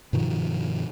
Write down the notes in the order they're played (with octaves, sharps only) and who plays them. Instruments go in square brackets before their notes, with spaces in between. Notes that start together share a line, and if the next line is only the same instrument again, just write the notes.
[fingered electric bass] G2 B2 D#3 F3